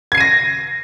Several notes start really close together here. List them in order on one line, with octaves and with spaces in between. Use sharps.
G#6 C7 D#7 A#6